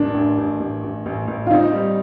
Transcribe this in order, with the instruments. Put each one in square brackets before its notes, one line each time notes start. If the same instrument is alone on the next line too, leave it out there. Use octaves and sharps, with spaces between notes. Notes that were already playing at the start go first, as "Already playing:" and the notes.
Already playing: [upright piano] A1 D#3 [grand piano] D4
[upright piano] A1
A1
A1
A1
A1
A1
[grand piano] F4
[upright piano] C4 [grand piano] D#4
[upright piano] G3